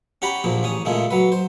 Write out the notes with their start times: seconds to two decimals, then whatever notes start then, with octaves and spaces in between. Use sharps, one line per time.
0.22 C#4 G4 F#5 A#5 B5
0.44 A#1 A#2 F3
0.63 A1 C#4 D#6
0.85 A#2 C#3 G#3 A3
1.11 F#3 B4
1.32 C5